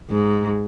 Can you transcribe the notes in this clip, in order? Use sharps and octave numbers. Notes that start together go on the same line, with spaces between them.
G#2